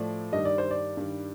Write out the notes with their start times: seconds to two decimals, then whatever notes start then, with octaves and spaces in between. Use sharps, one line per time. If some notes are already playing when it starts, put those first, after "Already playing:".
Already playing: A2 F3 A3 D5
0.32 G2 D#3 G3 D#5
0.45 D5
0.58 C5
0.71 D5
0.97 G2 D#3 G3